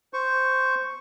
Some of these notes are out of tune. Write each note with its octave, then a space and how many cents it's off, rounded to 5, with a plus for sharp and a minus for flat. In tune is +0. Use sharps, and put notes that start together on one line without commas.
C5 -5 C#6 +0